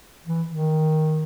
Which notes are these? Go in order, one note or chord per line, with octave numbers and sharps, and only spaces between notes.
E3
D#3